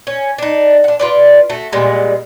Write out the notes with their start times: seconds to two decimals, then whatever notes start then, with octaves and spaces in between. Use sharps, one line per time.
0.07 C#4
0.38 D4 D#4
0.84 D4 F#5
0.99 F4 B4 D5
1.50 A3 F#4
1.72 A#2 G3 G#3 B3